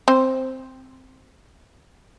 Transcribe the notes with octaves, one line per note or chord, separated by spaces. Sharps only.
C4 C5